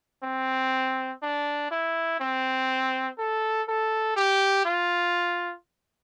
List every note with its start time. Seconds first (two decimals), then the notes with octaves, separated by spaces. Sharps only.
0.23 C4
1.22 D4
1.71 E4
2.20 C4
3.18 A4
3.68 A4
4.16 G4
4.65 F4